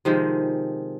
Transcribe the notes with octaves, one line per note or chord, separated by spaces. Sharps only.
C3 D#3 F3 G#3